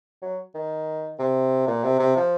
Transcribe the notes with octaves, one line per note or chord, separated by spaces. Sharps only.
F#3
D#3
C3
A#2
C3
C3
F3